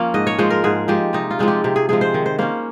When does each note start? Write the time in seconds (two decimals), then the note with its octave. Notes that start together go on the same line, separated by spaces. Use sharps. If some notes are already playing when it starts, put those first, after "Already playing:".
Already playing: F3 A#3 C#4
0.14 G#2 D#5
0.27 C#5
0.38 F3 G#3 C5
0.50 A#4
0.64 G#2 G#4
0.88 F3 G#3 G4
1.13 C3 D#4
1.31 F4
1.39 F3 G#3 C4
1.48 G4
1.64 C3 G4
1.76 G#4
1.89 F3 G#3 C4 G#4
2.01 C5
2.14 D#3
2.26 C5
2.39 A#3 C#4 C5